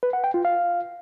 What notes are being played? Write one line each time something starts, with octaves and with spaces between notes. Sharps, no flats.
B4
F#5
G5
F4
F5